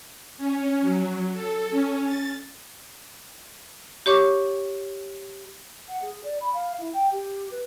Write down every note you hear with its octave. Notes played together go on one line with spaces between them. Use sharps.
C#4
F#3
A4
C#4
A6
G4 C#5 C#6 D6
F#5
G#4
D5
B5
F5
E4
G5
G4
B4